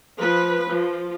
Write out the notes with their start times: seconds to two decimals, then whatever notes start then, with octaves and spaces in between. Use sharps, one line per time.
0.22 F3 B4
0.70 F3